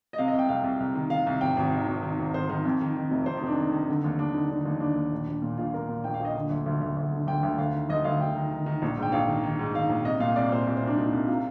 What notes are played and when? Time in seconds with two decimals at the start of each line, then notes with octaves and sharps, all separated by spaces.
0.13 D#5
0.18 C3 F5
0.28 D#5
0.33 C2
0.39 G5
0.49 C2 F5
0.64 C2
0.80 C2
0.95 D#3
1.10 D#3 F5
1.27 C2
1.41 G#1 G5
1.57 G#1
1.72 D#3
1.88 G#1
2.03 D#3
2.19 G#1
2.34 G#1 C5
2.49 D#3 C5
2.65 F2
2.81 D#3
2.96 D#3
3.11 F1
3.26 F1 C5
3.37 D#4
3.43 F1 D4
3.57 D#3 D#4
3.73 D#3
3.89 D3
4.04 D#2
4.19 D#2 D4
4.34 D3 D#4
4.49 D3 D4
4.61 D#4
4.65 D#2
4.71 D#4
4.80 D#2 D4
4.96 D#2
5.12 A#1
5.28 A#1
5.42 A#2
5.57 A#1 F4
5.74 A#2 A#4
5.89 A#2
6.04 A#1 G5
6.14 F5
6.20 A#1 D#5
6.35 D3 D#5
6.50 D2
6.66 D2
6.81 D2
6.97 D2
7.12 D3
7.27 D2 G5
7.43 D2
7.58 D2 F5
7.74 D#3
7.90 D2 D#5
8.04 D2 F5
8.20 D2 G5
8.35 D#3
8.51 D#3
8.66 D#3
8.82 A#1
8.97 G#2
9.03 G5
9.12 A#1 F5
9.28 D#3
9.43 D#3
9.59 G#2
9.74 D#3 F5
9.89 A#1
10.05 C2 D#5
10.20 A#2 F5
10.36 C2 D5
10.52 A#2 C5
10.67 C2
10.77 C5
10.83 C2 D4
10.97 A#2 D#4
11.13 C2
11.28 C3 F4